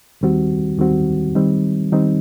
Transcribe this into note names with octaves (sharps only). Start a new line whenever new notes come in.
D#2 D#3 G3 C4 F#4
D#2 D#3 G3 C4 F#4
D#3 G3 C4 D#4
D#3 G3 C4 D#4